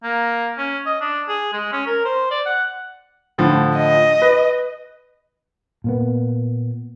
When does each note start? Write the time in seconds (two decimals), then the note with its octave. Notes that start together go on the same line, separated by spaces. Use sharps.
0.03 A#3
0.58 C#4
0.86 D#5
1.01 D4
1.28 G#4
1.53 G#3
1.72 C#4
1.86 A#4
2.05 C5
2.31 D5
2.46 F#5
3.38 A2 D3 F3
3.77 D#5
4.22 B4
5.84 A#2 A#3 B3